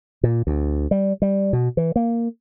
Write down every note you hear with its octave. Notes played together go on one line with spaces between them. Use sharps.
A#2
D2
G3
G3
B2
E3
A#3